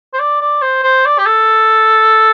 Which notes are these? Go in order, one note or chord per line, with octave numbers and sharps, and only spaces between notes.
C5
D5
D5
C5
C5
D5
G4
A4